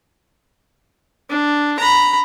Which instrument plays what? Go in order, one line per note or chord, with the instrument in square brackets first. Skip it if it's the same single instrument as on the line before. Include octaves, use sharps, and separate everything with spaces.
[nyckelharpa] D4
A#5 B5